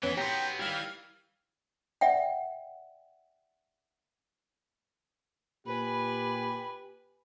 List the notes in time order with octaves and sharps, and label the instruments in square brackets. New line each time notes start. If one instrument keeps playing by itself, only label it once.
[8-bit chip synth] F2 B3 B4 [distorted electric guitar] E3 [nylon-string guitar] C#4
[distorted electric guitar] B1 B3 [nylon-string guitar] G4 [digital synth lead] G5 [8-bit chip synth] A#5 C6
[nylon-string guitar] D#3 G3 G4 [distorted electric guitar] E3 [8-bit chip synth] F5 G#6 [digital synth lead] F6
[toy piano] D5 E5 F#5 G5
[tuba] A#2 [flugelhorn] G4 [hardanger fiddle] B4 G#5 [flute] B5